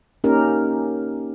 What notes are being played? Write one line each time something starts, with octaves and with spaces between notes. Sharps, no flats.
A#3 C#4 D#4 G4 A#4